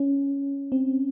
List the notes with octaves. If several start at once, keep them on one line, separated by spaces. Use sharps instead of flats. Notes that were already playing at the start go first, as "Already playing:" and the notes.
Already playing: C#4
C4